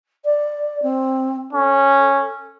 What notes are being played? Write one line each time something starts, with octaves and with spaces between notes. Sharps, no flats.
D5
C4
C#4 A4